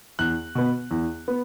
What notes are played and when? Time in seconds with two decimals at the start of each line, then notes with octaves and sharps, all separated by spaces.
0.19 E2 F#6
0.55 B2 B3
0.91 E2
1.28 B3